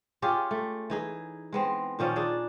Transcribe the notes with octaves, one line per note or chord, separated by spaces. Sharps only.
C#4 F4 G4 G#4
A3
E3 D#4 G#4
G#3 B3 C4
A#2 D#3 F3 C#4
D4 D#4 G#4